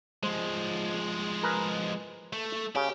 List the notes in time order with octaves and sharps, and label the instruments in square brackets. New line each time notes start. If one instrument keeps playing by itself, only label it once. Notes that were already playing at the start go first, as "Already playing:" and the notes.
[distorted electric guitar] F3 G#3 [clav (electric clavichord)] C5
[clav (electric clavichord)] G#4 A#4 B4
[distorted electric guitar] A3
[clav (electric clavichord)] C#3 [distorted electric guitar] G4